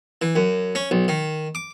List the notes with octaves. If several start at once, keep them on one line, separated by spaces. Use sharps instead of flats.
E3
F#2
C#4
B1
D#3
D6